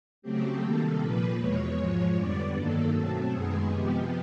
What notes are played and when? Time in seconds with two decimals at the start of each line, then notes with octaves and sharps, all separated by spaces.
0.22 C#3 F#3 A3 C4 G4
0.61 C3 D#3 G3 A#3 A4
0.99 A#2 F3 A#3 B4
1.38 E2 B2 G#3 C#5
1.77 G#2 F3 G#3
2.15 F2 D3 G3 B3 D5
2.54 G2 D#3 F#3 A#3 A4
2.93 B2 F#3 A3 C4
3.31 F#2 D#3 G#3 B3 G#4
3.70 C3 F3 G#3 B3 G4